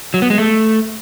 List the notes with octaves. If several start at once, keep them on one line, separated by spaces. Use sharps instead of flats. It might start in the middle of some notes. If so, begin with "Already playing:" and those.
F#3
B3
G#3
A3